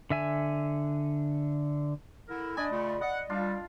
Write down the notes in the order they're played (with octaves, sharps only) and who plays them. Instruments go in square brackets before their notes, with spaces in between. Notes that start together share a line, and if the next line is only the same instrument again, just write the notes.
[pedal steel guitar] D3 E5 G#5
[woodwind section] D3 E4 A#4
[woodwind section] D4 G#5 [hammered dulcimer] D5 D#5 B5
[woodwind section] A#2 C#3 A3
[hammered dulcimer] D#5 [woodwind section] F#5
[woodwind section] G3 [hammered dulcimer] D4 F4